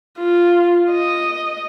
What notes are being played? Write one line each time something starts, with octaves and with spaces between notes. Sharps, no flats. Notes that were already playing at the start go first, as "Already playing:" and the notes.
F4
D#5